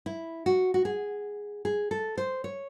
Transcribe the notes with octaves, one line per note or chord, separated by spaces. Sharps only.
E4
F#4
F#4
G#4
G#4
A4
C5
C#5